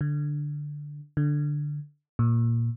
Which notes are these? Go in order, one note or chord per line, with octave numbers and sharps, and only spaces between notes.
D3
D3
A#2